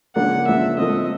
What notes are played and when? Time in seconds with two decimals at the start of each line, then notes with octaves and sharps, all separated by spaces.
0.15 C#3 F3 A#3 D4 F#5
0.47 C#3 F3 A#3 D4 E5
0.78 F3 A3 C4 D#5